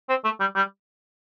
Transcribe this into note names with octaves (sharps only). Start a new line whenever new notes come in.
C4
A3
G3
G3